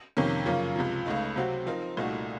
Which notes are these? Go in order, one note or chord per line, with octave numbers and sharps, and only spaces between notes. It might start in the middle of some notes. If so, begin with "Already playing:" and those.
F2 C3 D#3 A#3 C#4
F#2 C#3 F3 A#3 C#4
C#2 C3 F3
C#2 C#3 A3 D#4
C3 F#3 C4 F#4
F3 C4 D#4 A#4
C2 A#2 A3 D#4 F#4